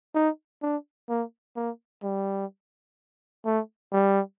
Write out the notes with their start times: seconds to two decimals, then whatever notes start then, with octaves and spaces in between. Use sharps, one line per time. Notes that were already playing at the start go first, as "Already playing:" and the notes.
0.15 D#4
0.62 D4
1.09 A#3
1.56 A#3
2.03 G3
3.45 A3
3.92 G3